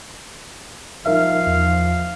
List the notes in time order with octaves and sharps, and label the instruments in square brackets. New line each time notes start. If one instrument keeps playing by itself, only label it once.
[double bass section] F3 [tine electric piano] D#4 A#4 E5 [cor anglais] F5
[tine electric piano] E2